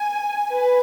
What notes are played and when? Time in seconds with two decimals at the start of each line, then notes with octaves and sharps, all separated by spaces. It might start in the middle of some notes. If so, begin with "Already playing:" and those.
Already playing: G#5
0.51 B4